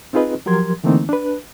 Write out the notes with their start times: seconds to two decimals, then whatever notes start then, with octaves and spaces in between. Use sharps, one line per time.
0.13 C4 D#4 F4 G#4 B4 D#5
0.46 F3 F#3 G4 A#4 C6 G#6
0.84 D3 E3 A3 A#3 C4 D#4
1.09 D4 B4